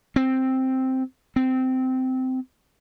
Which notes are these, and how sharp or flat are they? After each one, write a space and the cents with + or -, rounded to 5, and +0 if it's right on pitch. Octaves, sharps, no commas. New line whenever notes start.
C4 +0
C4 -15